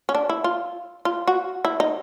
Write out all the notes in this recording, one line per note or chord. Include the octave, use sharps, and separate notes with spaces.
C#4
D4
E4
F4
F4
F#4
E4
D#4